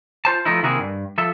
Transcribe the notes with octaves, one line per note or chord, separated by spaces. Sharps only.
F4 C5 A5
F3 A3 B3 D#4 E4
C3 D#3 A#3 E4 F#4 G#4
G2
F3 A4 E5